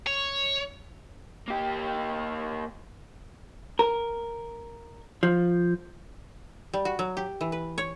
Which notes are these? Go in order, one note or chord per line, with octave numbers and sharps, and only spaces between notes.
C#5
A#3 G4
A#4
F3
G3
F#4
F#3
G4
E3
B4
C#5